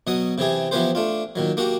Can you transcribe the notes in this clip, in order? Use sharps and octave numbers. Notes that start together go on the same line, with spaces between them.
B2 F#3 F#5 D#6
C3 E3 G4 G#4
E3 F3 B3 G4 B4 C5
A3 D4 F4
A#2 D#3 F#3
A#3 F#4 G4 F#5